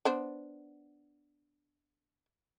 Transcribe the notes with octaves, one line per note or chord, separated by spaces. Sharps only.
B3 D4 C5